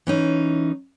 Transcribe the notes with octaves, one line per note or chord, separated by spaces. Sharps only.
E3 C#4 D#4